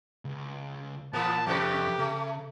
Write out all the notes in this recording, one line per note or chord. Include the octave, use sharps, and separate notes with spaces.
C#2
A#2 E3 A#3 B3 A#4 A5
F2 A2 C3 G4 B4
C#3 A3